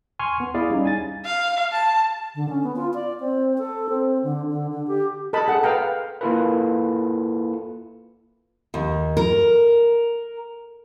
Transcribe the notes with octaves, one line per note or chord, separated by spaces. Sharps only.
G#5 C6 C#6 F6
B3
E4 G#4 D5 F5
G3 C#4 D#4
G#5 A6
F5
A5
D3
C#4
B3
F4
D5
C4
A4
C4
D3
D3
D3
G4
A4 D#5 A5 B5
G#4 F#5
B4 F5 G5 A#5
A#3 E4 F4 A4 B4
D#2
A#4